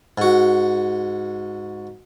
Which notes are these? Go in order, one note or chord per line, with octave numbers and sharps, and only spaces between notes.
G#2 F#4